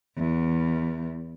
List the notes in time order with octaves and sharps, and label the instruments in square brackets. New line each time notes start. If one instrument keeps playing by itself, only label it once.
[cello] E2